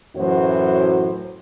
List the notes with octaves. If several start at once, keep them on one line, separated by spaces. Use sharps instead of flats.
F#2 A2 E3 F#3 F#4 C5